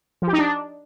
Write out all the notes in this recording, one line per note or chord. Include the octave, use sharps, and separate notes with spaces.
F3
G4
D#4
D4